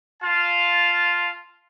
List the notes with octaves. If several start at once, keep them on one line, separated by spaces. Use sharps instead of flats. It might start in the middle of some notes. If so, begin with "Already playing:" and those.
F4 F5 A5